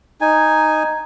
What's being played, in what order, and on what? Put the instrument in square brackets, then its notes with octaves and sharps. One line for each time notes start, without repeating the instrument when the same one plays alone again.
[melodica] D#4 G#5